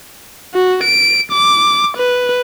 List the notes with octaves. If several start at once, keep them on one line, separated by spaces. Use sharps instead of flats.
F#4
D7
D6
B4